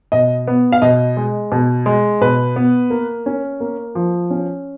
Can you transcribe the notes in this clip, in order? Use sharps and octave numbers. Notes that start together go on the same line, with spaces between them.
B2 D#5
B3
F5
B2 D#5
G#3
B2
G#3
B2 B4
B3
A#3
C#4
A#3
F3
C#4